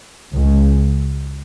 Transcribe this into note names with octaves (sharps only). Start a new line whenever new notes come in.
C#2 C#3 G#3